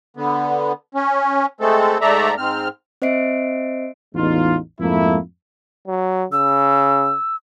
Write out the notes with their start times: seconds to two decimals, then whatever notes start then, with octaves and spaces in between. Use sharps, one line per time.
0.17 D3 B3
0.95 C#4
1.61 G#3 A3 C4 A4
2.01 G#2 A3 A4 D5 E5 A#5
2.38 G#2 C4 F6
3.02 C4 C5 D#5 E5 C7 D7
4.15 A1 E2 G#3 D#4 F4
4.80 F2 G#2 A3 A#3 E4
5.87 F#3
6.32 C#3 E6